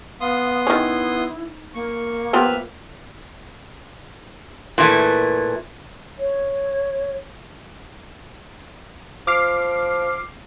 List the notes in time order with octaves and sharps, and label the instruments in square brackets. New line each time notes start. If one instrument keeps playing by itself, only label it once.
[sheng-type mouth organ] B3 C6 D#6 [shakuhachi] F5
[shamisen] D#3 C#4 [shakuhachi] E4
[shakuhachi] A#3 [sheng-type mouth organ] C#6
[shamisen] F3 B3 G4 [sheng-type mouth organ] B4 E5 F6
[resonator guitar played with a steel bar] A#2 E3 A3
[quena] C#5
[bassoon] F3 [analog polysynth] D6 F6 C7